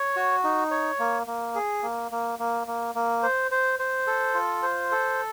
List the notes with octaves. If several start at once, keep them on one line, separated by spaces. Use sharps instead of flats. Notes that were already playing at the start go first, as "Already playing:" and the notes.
Already playing: C#5
F#4
D#4
C#5
A#3
A#3
G#4
A#3
A#3
A#3
A#3
A#3
C5
C5
C5
A4
F4
C5
A4